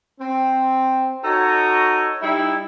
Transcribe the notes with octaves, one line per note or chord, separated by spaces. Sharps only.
C4
D#4 F#4 A4 C#5 D#5
G3 D#4 E4